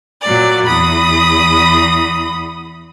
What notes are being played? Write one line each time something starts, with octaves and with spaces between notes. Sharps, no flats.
A#2 F#3 D5
E2 B5 D#6